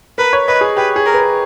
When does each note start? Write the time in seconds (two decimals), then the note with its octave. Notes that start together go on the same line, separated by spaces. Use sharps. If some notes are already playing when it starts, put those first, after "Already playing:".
0.18 A#4 B4
0.33 C#5
0.48 B4 D#5
0.61 G#4
0.76 G4 B4
0.96 G#4
1.06 A#4
1.14 B4